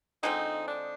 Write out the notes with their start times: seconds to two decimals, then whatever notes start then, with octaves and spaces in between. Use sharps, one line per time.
0.23 D3 F3 G#3 C4 D#4
0.68 D4